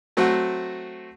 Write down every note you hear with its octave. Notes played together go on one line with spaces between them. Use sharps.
F#3 A3 C4 F#4